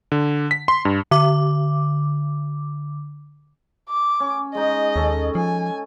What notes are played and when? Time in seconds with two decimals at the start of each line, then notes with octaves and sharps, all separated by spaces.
0.12 D3
0.51 B6
0.68 C6
0.85 G2
1.11 D3 D6
3.89 D6
4.20 C#4
4.55 G#3 D#4 D#5
4.96 D#2 C#4 A4
5.35 F3 G#5